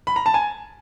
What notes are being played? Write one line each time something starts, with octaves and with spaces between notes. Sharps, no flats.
B5
A#5
A5
G#5